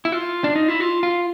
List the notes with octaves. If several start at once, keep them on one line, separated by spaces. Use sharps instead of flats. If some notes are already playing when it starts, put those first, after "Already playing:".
E4
F4
D4
D#4
E4
F4
F4